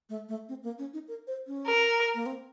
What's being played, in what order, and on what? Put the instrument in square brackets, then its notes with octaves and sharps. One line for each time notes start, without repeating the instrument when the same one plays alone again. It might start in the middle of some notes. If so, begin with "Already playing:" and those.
[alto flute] A3
A3
C4
A#3
C#4
D#4
A#4
C5
C#4
[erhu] A#4
[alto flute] A#3
C4